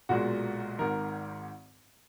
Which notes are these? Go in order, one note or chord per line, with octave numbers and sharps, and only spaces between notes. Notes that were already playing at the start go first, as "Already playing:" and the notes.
B1 A#2 G#3 F#4
G#1 G#2 D#3 A#4